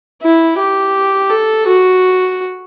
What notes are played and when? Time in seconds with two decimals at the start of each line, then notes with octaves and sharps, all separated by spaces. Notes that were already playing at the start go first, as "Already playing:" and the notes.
0.22 E4
0.58 G4
1.30 A4
1.67 F#4